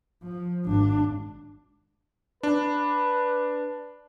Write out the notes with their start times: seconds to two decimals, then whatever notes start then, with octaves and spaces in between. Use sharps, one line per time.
0.23 F3
0.65 G#1 D4
2.43 D4 B4